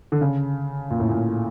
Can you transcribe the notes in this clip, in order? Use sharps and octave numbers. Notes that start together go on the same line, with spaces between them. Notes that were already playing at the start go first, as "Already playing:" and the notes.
D3
C#3
A#2
A2
A#2